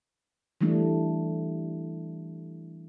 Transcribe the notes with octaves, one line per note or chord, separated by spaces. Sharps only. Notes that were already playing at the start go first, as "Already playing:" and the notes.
E3 G3 A3 D4